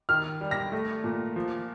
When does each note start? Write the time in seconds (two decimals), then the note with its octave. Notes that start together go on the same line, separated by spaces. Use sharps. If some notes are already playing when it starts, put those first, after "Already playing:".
0.09 D#3 F6
0.41 G3
0.51 A#6
0.72 A3
1.04 A#2
1.36 F3